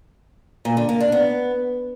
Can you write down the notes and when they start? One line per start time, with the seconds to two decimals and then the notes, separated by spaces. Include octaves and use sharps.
0.65 A#2
0.77 D3
0.89 A#3
1.00 D4
1.12 B3